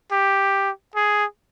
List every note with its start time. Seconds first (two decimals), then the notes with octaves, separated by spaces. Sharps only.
0.12 G4
0.96 G#4